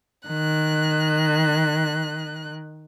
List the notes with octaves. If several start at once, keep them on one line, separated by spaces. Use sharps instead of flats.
D#3 F#6